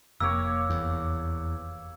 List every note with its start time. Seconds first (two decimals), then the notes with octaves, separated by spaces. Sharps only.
0.20 F1 A#3 G4 C#5 E6
0.70 E2